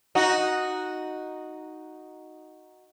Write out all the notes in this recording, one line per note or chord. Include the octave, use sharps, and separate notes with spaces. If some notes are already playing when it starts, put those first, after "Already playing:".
D#4 F#4